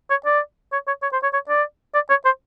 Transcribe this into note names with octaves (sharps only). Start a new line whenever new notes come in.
C#5
D5
C#5
C#5
C#5
C5
C#5
C#5
D5
D5
C#5
C5